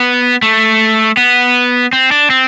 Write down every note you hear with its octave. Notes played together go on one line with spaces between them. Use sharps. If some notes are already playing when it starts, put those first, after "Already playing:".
Already playing: B3
A3
B3
C4
D4
C4